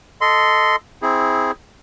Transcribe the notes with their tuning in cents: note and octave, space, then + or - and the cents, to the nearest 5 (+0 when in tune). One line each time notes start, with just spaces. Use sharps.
A4 +0 D#5 +0 C6 -15
C4 +0 E4 -25 G#4 +0